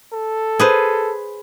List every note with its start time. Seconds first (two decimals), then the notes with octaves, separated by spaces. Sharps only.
0.13 A4
0.59 G#4 B4 C5